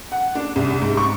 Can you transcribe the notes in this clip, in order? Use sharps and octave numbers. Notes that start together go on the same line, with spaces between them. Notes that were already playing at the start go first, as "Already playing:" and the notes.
F#5
D4
C2
G#2
C#6